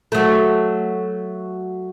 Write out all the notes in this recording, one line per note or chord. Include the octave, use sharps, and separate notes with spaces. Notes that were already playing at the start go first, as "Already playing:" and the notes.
F#3 A3